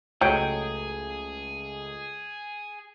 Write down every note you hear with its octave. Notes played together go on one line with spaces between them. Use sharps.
C#2 F#3 A3 G#4 D#5 G5